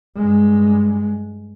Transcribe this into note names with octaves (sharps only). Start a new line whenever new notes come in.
G2 G#3